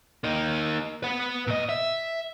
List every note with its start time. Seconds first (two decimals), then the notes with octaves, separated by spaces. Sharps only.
0.24 A#3 D#4
1.03 B4 F#5
1.47 A#2 D#5
1.69 E5